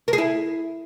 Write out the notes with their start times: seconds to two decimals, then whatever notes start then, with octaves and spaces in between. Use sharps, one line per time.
0.08 A#4
0.13 G#4
0.18 E4